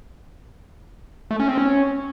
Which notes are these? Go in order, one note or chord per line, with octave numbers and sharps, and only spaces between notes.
A3
C#4
C4
C#4